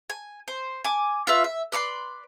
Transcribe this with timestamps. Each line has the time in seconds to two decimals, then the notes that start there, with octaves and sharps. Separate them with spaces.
0.10 G#5
0.48 C5
0.85 G#5 D6
1.27 F4 B4 E5
1.44 E5
1.72 B4 D5 B5 C6